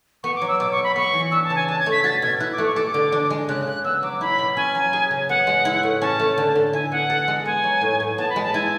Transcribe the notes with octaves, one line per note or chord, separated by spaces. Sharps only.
B3 C#6
D6
F#3
E6
B2 D6
C#6
B2
B5
B3 C#6
E3
D4 E6
A5
C#3
G#5
D4 A5
G#6
A3
B6
F#4 A6
B2 G#6
E4 F#6
D6
A3
C#6
A4 D6
D3
D4
G#3
C#3 F#6
C#3 F#6
B3 E6
F#3 D6
E4 B5
B2
C#4 G#5
F#3
G#4
C#3
B3 F#5
G#3
E4
A2
C#4 A5
A3
D3
D3
E4 G#5
B3 F#5
A4
G#3
B3 G#5
F#3
A2
A2
B3 A5
B5
G#3
A5
E4 G#5